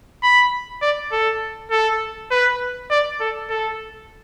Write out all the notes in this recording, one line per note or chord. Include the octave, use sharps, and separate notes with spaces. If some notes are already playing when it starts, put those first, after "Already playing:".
B5
D5
A4
A4
B4
D5
A4
A4